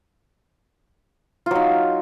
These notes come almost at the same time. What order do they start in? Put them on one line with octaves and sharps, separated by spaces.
F4 F#3 D#4